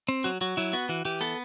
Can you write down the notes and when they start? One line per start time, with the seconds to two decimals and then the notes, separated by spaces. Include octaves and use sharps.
0.09 C4
0.24 F#3 F#4
0.41 F#3 F#4
0.57 F#3 E4
0.73 B3 F#4
0.89 E3 F#4
1.05 E3 G4
1.21 B3 A4